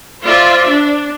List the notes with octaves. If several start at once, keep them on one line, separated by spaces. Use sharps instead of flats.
F4 C5 D5 E5
D4